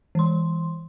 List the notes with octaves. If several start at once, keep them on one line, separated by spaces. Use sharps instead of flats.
E3 C6